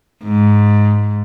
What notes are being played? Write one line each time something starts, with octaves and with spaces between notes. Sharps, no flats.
G#2